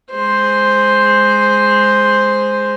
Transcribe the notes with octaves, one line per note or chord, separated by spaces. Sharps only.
G#3 C5